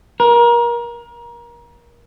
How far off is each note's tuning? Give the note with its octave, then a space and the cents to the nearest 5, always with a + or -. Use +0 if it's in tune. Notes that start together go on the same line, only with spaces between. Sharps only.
A#4 +25